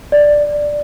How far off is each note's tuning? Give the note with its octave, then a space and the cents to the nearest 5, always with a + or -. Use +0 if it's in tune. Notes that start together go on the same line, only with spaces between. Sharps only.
D5 +5